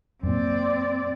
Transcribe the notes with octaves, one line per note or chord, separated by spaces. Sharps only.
F#2 A#2 C4 D5